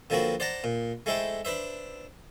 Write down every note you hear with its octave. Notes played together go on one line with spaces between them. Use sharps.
D3 F3 A#3 C4 F#4 B4
C5 D5 F#5 A5 A#5
A#2
G#3 A3 E4 A4 C5 G5
D4 B4 C5 E5